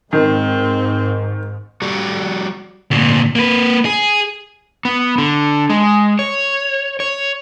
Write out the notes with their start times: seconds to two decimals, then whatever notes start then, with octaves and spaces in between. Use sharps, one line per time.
0.13 G#2 D#3 C4
1.82 G3 F#4 G4 D5
2.91 D2 A#2
3.36 A#3 B4
3.85 G#4
4.85 B3
5.18 D3
5.70 G#3
6.19 C#5
7.00 C#5